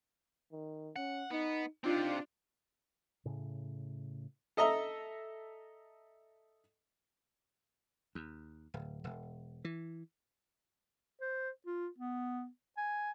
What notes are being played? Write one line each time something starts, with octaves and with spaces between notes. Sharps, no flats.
D#3
C#4 F#5
B3 D#4
C4 D4 D#4 F4 G4
A2 C#3
A4 D#5 E5 A#5
D#2
D1
E1
E3
C5
F4
B3
G#5